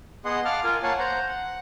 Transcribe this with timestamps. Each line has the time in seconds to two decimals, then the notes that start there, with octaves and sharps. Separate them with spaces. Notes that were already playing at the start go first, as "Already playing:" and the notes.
0.25 B3 G#4 D#5 F#5 C6
0.45 F5 F#5 A5 D6 F6
0.64 F4 A#4 G#5
0.83 A#3 C#5 F5 F#5 G#5 A5
0.99 C5 F#5 A#5
1.29 F#5